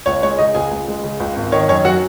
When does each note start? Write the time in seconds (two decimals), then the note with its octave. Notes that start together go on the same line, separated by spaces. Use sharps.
0.06 C#2 C#5
0.22 G#3 C#5
0.38 C#3 D#4 D#5
0.55 C#2 G#4 G#5
0.71 C#2
0.88 G#3
1.04 C#3
1.20 C#2
1.36 G#1
1.52 D#3 C#5
1.68 F#2 C#5
1.84 F#3 F#4 F#5